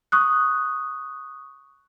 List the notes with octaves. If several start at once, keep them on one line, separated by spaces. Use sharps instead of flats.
C#6 D#6 F#6